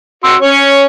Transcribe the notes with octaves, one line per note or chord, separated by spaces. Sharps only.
F#4 C6 E6
C#4 C#5